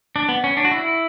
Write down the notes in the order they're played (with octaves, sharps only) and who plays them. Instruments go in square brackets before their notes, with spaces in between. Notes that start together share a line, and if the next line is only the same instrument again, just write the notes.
[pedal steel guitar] D4
B3
C#4
D4
F#4
E4